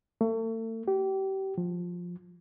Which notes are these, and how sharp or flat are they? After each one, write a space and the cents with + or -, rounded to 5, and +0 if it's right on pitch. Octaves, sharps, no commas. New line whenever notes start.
A3 +40
G4 -30
F3 +10